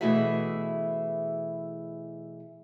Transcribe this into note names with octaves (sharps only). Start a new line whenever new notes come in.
B2 E3 A3 E4 G#4 E5